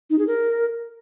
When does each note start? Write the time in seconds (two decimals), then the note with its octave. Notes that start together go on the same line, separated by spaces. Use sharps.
0.10 D#4
0.19 G#4
0.27 A#4